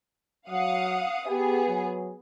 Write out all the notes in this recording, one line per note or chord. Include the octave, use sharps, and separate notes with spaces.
F#3 F5 F#5 D#6
B3 G4 G#4
F#3